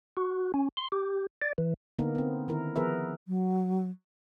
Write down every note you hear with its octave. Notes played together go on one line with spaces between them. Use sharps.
F#4
C#4
C6
G4
D5
E3
D3 A#3 B3 D#4 A#4
B3 C4
D#3 E4 A#4
F3 B3 G#4 A#4 B4 E5
F#3